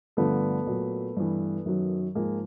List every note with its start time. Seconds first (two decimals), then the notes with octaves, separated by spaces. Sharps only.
0.17 G2 D3 F3 A3 B3
0.67 A#2 F#3
1.17 G2 E3
1.66 F#2 D#3 F#3
2.15 G#2 F3 G#3 A#3